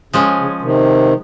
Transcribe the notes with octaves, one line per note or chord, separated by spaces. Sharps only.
C#3 F3 G#3 C#4
C#3
C3 D#3